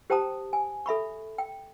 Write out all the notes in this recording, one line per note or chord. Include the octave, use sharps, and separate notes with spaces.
G4 C5 G5 A5 A#5 D#6
G#5
A4 E5 B5 C#6
G5